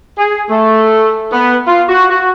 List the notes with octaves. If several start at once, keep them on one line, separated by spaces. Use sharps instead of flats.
G#4
A3
B3
F4
F#4
F#4